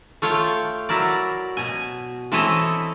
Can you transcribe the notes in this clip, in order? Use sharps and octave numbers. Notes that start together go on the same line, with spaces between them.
A3 F4 C#5 F5 G5
F#3 E4 A#4 D5
B2 G#5
E3 C4 E4 A4 C#5 D#5